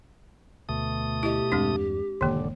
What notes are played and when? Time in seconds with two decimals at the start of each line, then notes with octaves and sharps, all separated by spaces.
0.69 D2 B2 A3 D#6
1.23 E4 G4 D#5
1.52 E2 G2 G#3 C4 D4
2.21 E1 G#2 D3 D#3 A#3